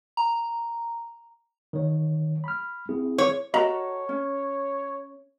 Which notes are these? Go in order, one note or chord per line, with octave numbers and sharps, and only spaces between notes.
A#5
D#3 C#5
B5 F6
C4 E4 G#4
C#5
F#4 A4 A#4 C#5 D#5 A#5
C#4